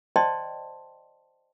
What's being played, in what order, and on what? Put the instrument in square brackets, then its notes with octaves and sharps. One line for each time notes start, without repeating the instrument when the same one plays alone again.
[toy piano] C5 D5 D#5 G5 A5 C6